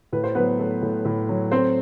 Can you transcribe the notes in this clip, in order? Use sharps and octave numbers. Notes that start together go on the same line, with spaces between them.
A2 B4
C5
F#3 B3 B4
A3
A2
A2
F#3
A3 C4 C5